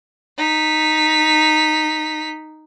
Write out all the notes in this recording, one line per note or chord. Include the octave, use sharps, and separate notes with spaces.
D#4 B6